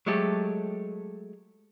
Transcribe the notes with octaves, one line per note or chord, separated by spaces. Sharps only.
F#3 G#3 A3 G4 A4